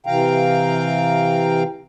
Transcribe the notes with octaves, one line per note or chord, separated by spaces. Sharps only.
C3 E3 F5 G5 A#5